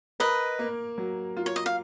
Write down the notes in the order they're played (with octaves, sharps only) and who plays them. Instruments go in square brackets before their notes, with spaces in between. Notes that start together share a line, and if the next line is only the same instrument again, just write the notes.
[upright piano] A#4 [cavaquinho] B4 D#5
[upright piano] A#3
F#3
F4
[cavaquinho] C#5
D#5
F5